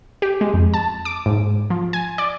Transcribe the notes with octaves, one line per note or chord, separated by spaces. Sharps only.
G4
G#3
F2
A5
D6
G#2
F3
G#5
D5